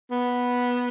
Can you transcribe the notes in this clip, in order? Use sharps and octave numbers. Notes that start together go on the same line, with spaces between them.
B3